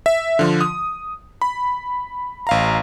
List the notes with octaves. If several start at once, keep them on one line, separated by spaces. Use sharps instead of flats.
E5
D3 F3
D#6
B5
A1 F5 A#5